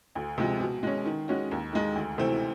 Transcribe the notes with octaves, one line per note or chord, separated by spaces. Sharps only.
D2
C3 F3 G#3
B2
G#3 C#4
D#3
G#3 C#4 F#4
D#2
D#3 G#3
D2
C3 E3 A3 C4